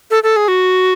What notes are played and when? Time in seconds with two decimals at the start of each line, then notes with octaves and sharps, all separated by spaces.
0.11 A4
0.23 A4
0.36 G#4
0.48 F#4